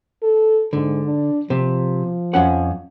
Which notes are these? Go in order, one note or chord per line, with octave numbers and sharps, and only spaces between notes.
A4
G#2 D3
D4
C3 F3
F2 C#4 F#5